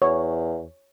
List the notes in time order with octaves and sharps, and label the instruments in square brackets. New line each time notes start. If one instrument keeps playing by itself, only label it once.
[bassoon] E2 [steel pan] C#5